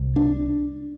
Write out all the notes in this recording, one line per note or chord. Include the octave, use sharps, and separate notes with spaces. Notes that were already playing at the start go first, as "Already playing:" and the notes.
Already playing: C2
D4